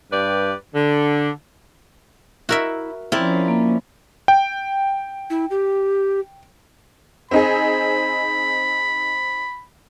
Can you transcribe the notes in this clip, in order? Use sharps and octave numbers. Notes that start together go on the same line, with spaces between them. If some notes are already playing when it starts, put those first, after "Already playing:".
G2 G4 B4 D5
D3
E4 F#4 A#4 E5
F3 C4 C#4 E4 A#4 D5
A#3
G5
E4
G4
C4 D#4 G#4 B5